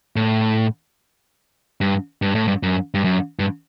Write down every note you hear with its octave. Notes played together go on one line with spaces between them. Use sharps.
A2
G2
G2
A2
G2
F#2
G2
F#2
G2